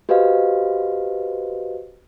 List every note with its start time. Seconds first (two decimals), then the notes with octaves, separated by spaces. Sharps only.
0.09 F#4 G4 B4 C5 D#5 F5